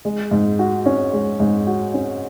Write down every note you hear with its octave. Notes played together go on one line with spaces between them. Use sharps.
G#3
G#2
F#4
C#4
G#3
G#2
F#4
C#4